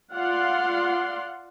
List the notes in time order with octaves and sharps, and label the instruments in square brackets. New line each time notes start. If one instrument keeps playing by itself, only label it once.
[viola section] F4 D5 F5 F#5 C6